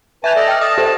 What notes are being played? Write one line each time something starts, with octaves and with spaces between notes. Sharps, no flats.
B4 E5 G#5 A5 G6 F7
A4 D5 D#5
G5 F6
A5 D#6 F6 A#6
G4 A4 C5